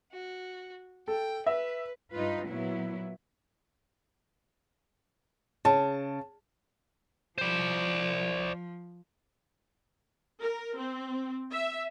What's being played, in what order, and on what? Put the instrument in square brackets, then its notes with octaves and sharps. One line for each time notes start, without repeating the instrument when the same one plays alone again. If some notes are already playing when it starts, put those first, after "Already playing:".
[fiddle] F#4
[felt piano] A4 [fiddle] G5
[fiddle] B4 [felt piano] E5
[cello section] G2 D#4 F4 B4
A#2 F#3 B3 E4
[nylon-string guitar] C#3 [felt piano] A5
[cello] F3 [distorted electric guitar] C5 D5
[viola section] A#4
C4
E5